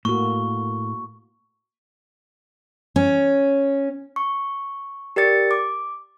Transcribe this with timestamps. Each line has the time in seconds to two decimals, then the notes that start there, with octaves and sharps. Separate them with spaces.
0.05 A2 A#3 F#4 C#6
2.96 C#4
4.16 C#6
5.16 G4 A#4 D5 A6 C#7
5.51 D6